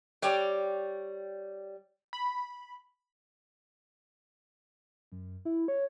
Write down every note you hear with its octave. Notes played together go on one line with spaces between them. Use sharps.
G3 C#5 D5 G5
B5
F#2
E4
C#5